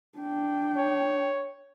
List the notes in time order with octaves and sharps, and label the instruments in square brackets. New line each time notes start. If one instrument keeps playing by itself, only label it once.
[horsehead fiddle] D4 G5
[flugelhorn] C#5